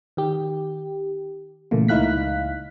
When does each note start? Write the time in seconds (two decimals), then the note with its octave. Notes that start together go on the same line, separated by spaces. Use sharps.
0.17 D#3 G4
1.71 A#2 C#3 E3 A3 A#3
1.88 C#2 D#4 E4 F5 F#6 B6